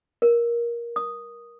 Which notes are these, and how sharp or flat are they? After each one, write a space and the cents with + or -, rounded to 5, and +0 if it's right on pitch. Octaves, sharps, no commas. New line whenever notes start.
A#4 +15
D#6 -5